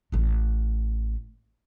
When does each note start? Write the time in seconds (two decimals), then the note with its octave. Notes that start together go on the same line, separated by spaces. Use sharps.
0.12 A1 A3